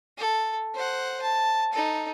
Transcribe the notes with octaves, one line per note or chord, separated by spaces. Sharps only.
A4
C5 F#5
A5
D#4 A4